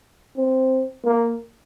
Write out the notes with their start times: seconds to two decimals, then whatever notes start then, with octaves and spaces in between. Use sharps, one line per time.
0.37 C4
1.05 A#3